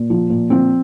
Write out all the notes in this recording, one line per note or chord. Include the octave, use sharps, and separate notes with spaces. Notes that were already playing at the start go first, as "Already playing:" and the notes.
Already playing: A#2
F3
A#2
F3 C4